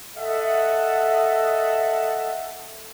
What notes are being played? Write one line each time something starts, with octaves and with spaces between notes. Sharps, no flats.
A4 D#5 E5 F#5